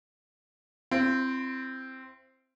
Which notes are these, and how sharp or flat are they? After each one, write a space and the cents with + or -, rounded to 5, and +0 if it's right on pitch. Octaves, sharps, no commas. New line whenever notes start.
C4 +0 E4 +45